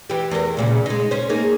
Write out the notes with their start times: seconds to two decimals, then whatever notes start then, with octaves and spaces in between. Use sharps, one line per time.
0.10 E3 G4
0.31 E2 A#4
0.57 D2 A#2 C#3
0.86 G#3 D#4
1.11 C#4 C5
1.30 A#3 D#4 G#4